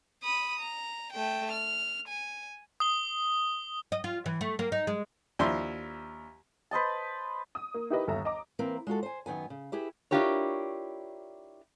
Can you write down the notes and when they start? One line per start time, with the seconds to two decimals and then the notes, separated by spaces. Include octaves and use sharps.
0.23 B5 D#6
0.60 A#5
1.13 A3 G5
1.51 F6
2.08 G#5
2.80 D#6 G7
3.92 D#5
4.04 F4
4.26 E3
4.41 A3
4.59 A#3
4.72 D#4
4.87 G#3
5.39 D#2 F3 D4 E4 C6
6.71 B4 C5 D#5 A5
7.55 D#6
7.74 A#3
7.90 D#4 E4 G4 A#4 B4 D#5
8.07 G1 D#2 A4 E5 A#5
8.25 D#5 A#5 D6
8.59 E3 A#3 C4 A#4 B4
8.87 G#3 F4 F#4 A4
9.03 C5 G#5
9.26 F#2 D#3 B3 G#5
9.50 C#3
9.72 E4 G4 G#4 B4
10.11 D4 E4 F4 G4 A#4 C#5